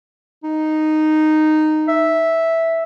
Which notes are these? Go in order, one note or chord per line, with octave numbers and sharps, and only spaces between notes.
D#4
E5